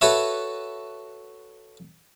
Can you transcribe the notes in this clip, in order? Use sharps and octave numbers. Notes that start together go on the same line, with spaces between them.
F#4 A4 B4 C#5 E5